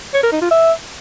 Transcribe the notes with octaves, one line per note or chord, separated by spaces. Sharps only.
C#5
A#4
D#4
F4
E5